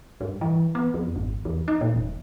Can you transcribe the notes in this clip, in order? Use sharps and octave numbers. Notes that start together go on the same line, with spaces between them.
G2
E3
B3
F2
G#1
E2
D#4
A#2
E1